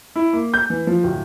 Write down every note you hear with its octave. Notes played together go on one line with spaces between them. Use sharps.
E4
A#3
G6
E3
F3
D1